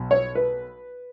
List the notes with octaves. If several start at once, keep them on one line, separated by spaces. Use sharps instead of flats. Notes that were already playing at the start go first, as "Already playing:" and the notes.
Already playing: B1
C#5
B4